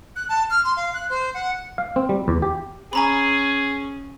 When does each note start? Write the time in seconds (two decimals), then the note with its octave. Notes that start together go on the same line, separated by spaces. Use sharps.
0.16 F#6
0.29 A5
0.50 F6
0.64 C6
0.76 F5
0.93 F#6
1.09 C5
1.34 F#5
1.78 F5
1.96 C4
2.09 G3
2.28 E2
2.42 G4
2.93 C#4 G#4 G#5 A#5 B5